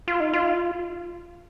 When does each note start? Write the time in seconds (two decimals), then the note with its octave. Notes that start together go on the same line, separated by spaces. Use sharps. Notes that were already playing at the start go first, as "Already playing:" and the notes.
0.08 F4
0.20 D#4
0.33 F4